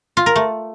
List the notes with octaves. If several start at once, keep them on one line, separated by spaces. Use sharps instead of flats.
F4
A#4
A3